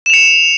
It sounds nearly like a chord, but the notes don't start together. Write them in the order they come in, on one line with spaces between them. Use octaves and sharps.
E7 F7 C#7